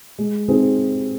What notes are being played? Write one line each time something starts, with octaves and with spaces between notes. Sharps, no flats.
G#3
C4 D#4 G#4